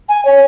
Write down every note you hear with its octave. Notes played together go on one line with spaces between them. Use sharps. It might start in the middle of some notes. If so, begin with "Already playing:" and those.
G#5
C#5